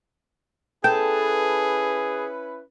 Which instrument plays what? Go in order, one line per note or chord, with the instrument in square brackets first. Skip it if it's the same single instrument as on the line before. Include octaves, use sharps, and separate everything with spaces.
[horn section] C#4 E4 B4 [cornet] G#4 [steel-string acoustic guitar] A4 A5 [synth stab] G5